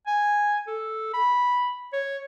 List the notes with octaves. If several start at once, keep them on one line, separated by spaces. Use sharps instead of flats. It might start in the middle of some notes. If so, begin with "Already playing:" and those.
G#5
A4
B5
C#5